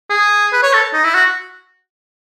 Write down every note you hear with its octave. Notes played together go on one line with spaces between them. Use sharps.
G#4
B4
C#5
A4
D#4
E4
F#4